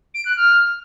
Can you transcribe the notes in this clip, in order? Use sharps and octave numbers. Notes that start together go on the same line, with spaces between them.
D7
F#6
F6